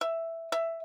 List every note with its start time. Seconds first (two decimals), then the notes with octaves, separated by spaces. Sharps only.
0.01 E5
0.52 E5